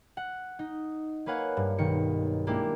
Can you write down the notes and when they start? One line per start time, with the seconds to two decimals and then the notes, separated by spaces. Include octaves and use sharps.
0.17 F#5
0.59 D#4
1.26 A#3 B4 C#5 F5 F#5 G#5
1.57 G2
1.78 B1 D#3 C#7
2.47 G#3 A#3 D4 E4 G4